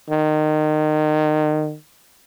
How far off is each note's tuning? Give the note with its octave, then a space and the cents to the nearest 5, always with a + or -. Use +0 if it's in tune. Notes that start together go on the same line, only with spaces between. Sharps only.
D#3 -25